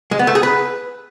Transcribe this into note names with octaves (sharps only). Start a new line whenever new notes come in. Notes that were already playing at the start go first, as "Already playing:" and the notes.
G#3
B3
A3
G#4
B4